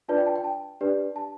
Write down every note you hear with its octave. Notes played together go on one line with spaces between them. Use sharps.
D4 F4 B4 D5 A5
G5
A5
G5
A5
D4 G4 B4 D5
A5